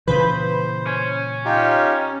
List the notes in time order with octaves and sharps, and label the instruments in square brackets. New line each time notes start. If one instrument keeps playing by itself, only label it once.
[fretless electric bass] A#2 C#3 E3 [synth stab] B4 B5 G6 [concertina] C5
[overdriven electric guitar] C#4
[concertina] D#4 F4 G4